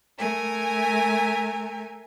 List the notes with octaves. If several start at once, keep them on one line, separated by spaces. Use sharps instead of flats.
A3 A#4 G#5